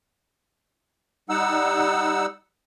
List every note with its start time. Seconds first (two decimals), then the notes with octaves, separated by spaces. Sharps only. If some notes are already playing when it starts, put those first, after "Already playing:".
1.29 G3 D#4 F#5 E6